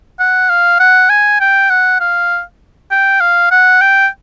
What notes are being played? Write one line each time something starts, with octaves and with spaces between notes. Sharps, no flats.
F#5
F5
F#5
G#5
G5
F#5
F5
G5
F5
F#5
G5